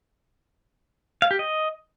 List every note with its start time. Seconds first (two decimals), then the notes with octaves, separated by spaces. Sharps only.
1.22 F5
1.31 G4
1.39 D#5